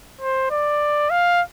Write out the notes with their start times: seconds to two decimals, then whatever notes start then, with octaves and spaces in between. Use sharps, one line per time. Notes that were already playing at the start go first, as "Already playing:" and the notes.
0.21 C5
0.51 D5
1.10 F5